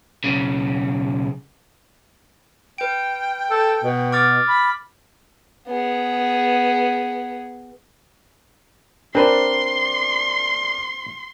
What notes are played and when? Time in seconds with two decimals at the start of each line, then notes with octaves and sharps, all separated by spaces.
0.24 B1 C#3
2.78 B4 G5 D7
3.50 A4
3.84 B2
4.12 D6 F6 A6
4.48 B5
5.67 B3 G#4
9.15 C4 D4 A#4 B4 A5 C6